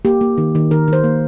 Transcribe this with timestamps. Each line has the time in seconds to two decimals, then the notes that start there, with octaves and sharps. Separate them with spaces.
0.05 A#3 G4
0.21 A#3
0.38 D#3
0.55 D#3
0.71 D#3 A#4
0.88 D#3
0.93 C5
1.04 A#3